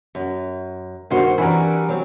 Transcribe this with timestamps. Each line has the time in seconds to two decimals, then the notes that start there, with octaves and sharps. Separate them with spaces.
0.15 F#2
1.10 G2 D#3 B3 F#4 C5
1.38 E3 G3 D4 F#4 A#4
1.89 F#3 C4